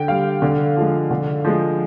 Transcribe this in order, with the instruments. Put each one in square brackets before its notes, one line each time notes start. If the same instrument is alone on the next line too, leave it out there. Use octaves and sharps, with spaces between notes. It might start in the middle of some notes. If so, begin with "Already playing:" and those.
Already playing: [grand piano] D3 G5
G3 F5
D3
F3 G#3
D3
F3 G#3